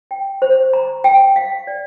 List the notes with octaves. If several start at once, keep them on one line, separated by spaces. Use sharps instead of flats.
G5
C5
A#5
G5
F5
D5